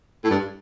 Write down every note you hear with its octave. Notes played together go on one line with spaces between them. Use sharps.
A2
G2